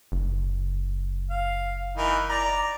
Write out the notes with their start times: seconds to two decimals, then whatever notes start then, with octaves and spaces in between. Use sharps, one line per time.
0.12 F#1
1.30 F5
1.97 E3 D#4 A#4
2.30 D5 A#5